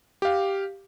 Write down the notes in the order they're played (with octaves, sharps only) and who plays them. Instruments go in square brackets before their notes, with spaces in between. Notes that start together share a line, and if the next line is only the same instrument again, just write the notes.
[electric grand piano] G4 F5